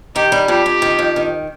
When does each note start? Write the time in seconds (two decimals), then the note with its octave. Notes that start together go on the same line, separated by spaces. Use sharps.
0.15 D#3 G4
0.32 G3
0.48 F2 G4
0.66 F2
0.82 D#3
0.99 F2
1.16 D#3